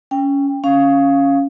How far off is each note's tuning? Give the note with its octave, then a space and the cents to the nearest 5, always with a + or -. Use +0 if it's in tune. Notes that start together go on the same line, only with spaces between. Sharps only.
C#4 +15 G5 +15
C#4 +0 F5 +0